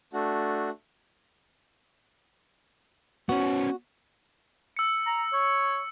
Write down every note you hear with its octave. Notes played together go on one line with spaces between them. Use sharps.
A3 D4 F#4
B3 C#4 F#4
E6 C#7
A#5
C#5